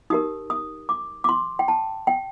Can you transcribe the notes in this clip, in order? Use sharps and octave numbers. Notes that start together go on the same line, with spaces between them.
D#4 G4 A#4 D#6
D#6
D6
D6
C6
G5
A5
G5